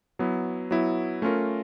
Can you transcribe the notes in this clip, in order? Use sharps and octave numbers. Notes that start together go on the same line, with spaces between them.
F#3 B3 E4
F#3 B3 E4
A3 C#4 F4 A#4